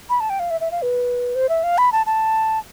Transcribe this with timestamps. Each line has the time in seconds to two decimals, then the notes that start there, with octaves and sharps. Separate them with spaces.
0.10 B5
0.20 A5
0.30 G5
0.40 F5
0.51 E5
0.61 E5
0.71 F5
0.82 B4
1.35 C5
1.49 E5
1.64 F5
1.78 B5
1.92 A5
2.06 A5